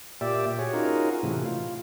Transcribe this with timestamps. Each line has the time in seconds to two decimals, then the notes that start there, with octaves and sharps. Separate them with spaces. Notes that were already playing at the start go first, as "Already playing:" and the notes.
0.21 A#2 G4 D5 E5
0.59 F#4 G#4 C#5
0.73 C#4 D#4 F4 F#4 G#4 A#4
1.23 A2 C3 E3
1.45 F4